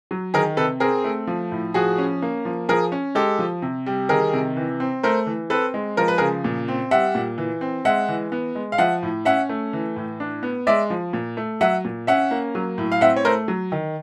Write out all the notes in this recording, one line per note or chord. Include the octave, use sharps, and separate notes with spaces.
F#3
D#3 G#4 A#4
C3 A4 B4
C4 G#4 A#4
A3
F3
A2
F3 F#4 G#4
C#4
A#3
F3
F3 G#4 A#4
C#4
G#3 G4 A4
F3
C3
G3
D#3 G#4 A#4
C3
E3
C4
A3 A#4 C5
E3
C4 A4 B4
G#3
F3 A#4
B4
C#3 G#4 A#4
A#2
C4
G3 E5 F#5
A#2
E3
C4
G#3 E5 F#5
E3
B3
G#3
F5
F3 E5 F#5
A2
C#4 E5 F#5
A3
E3
A2
D4
B3
G#3 D5 E5
F3
A#2
A3
F#3 E5 F#5
A#2
C#4 E5 F#5
A#3
F#3
A2
F5
C4 E5 F#5
C#5
A3 A#4 C5
F#3
D#3